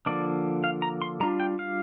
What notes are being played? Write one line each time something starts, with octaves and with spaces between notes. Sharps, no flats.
D3 F3 A#3 D4 D5
F5
A#5
C6
G3 D4 F4 A#5
G5
F5